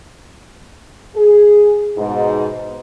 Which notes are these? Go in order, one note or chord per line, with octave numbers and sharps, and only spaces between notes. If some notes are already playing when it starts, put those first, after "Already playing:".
G#4
G#2 B2